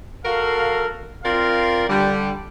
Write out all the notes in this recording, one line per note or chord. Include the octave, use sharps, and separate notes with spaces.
F#4 A4 A#4 F5
C4 F4 A#4 D5 F5
D3 G3